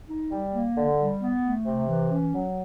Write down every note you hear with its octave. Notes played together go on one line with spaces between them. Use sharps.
D#4
G3
A#3
D3
G3
B3
A3
C3
E3
C#4
F#3